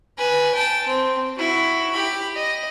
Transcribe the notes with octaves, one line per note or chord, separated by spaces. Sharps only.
B4 G#5
G5 A5
C4
E4 F#4
G4 B5
D#5